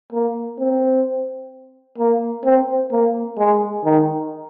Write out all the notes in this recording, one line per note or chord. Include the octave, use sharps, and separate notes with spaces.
A#3
C4
A#3
C4
A#3
G#3
D#3